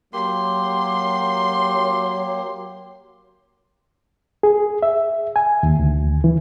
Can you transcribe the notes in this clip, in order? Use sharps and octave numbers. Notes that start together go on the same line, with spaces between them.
F#3 A#3 G4 C6
G#4
E5
G#5
D#2
D2
E3